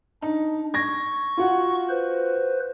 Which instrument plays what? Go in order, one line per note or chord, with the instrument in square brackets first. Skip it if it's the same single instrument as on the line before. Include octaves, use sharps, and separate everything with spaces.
[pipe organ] D4 [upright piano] D#4
[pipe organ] C#6 [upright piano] G#6 A#6
[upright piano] F4 F#4 F#5
[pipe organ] B4 C5